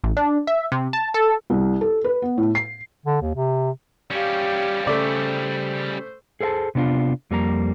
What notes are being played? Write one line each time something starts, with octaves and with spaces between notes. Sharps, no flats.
A1
D4
E5
C3
A5
A4
C2
A4
B4
B3
A2
C7
D3
D#2
C3
G3 C#4 G4 F5
C#3 A3 C5 D5
G#4 A4 C5 F5 A5
C3 B3 D4 F4
F2 G3 A#3 A#5